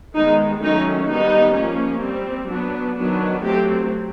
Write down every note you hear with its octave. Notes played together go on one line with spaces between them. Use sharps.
D#3 G#3 B3 D#4
D#3 F#3 A3 C#4 D#4
D#3 G3 B3 D#4
F3 A#3 C#4
G3 C4
F#3 B3 D4
D#3 F#3 B3 D4
F#3 A3 C4 G4